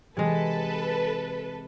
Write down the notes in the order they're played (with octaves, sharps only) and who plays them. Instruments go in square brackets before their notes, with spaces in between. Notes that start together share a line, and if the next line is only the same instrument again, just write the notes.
[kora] C3 G#3 [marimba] E3 [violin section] A4 B4